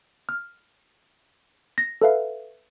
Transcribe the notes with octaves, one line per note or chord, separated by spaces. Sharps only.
F6
A#6
A4 B4 E5 F5